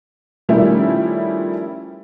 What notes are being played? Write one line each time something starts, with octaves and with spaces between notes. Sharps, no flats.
D#3 F3 G3 A3 C#4 E4